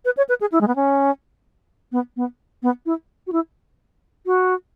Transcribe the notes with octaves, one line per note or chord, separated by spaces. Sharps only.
B4
C#5
B4
G#4
E4
G#3
B3
C#4
B3
B3
B3
E4
F#4
E4
F#4